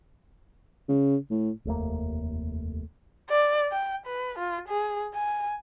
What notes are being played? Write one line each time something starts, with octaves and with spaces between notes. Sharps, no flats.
C#3
A2
F1 D#2 A3 A#3
D5
G5
B4
F4
G#4
G#5